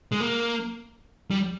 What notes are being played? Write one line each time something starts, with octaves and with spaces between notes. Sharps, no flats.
G#3
A#3
G3